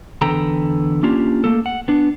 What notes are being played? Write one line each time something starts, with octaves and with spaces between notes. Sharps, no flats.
E2 D3 A4 B4 G5 A#5
A#3 C#4 D4 F4 G4
A3 A#3 A4
F#5
B3 D4